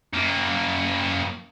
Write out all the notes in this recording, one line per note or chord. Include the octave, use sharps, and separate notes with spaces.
F#2 A#3